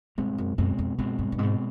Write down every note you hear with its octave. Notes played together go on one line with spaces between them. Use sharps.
G2 B2 G#3 C4
F#2
F#2 B2 G#3 C4
F2
F#2 B2 G#3 C4
G2
G2
G#2 B2 G#3 C4